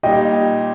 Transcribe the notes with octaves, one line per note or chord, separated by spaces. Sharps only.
A#2 G3 D#4 G4 D#5 G5